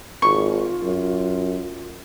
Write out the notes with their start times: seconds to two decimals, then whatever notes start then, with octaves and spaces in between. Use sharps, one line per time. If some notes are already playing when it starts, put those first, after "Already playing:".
0.22 G#1 F4 C#6
0.83 F#2